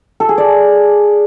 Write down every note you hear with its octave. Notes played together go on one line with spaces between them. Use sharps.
A4
G#4
D5